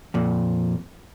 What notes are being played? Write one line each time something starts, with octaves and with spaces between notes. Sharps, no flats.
F2 A#2